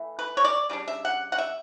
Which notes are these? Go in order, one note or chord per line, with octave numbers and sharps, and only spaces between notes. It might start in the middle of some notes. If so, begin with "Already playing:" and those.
Already playing: E3 A3 E4
B4
C#5
D5
C#3 G3 D4
E5
F#5
F#5
E5